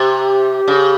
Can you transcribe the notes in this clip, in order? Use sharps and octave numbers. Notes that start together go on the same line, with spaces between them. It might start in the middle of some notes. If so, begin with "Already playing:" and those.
Already playing: C3 G4
C#3